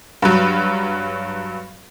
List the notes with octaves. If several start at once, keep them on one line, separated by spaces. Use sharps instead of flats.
G2 F#3